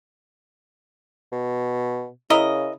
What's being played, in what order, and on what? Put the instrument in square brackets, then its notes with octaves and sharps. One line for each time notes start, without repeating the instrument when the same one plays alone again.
[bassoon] B2
[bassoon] C#3 [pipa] E4 A#4 D#5